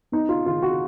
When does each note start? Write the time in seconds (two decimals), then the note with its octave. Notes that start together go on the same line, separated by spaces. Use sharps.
0.12 B3 D#4
0.29 F4
0.46 D#3 F4
0.62 F#4